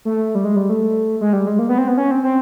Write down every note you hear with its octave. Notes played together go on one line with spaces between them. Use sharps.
A3
G3
G#3
G3
A3
G#3
G3
G#3
A#3
B3
C4
B3
C#4
C4
C4